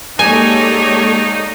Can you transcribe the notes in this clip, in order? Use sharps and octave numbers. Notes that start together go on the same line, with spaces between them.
G#3 A#3 D#4 G4 A4 C#5 D5 G#5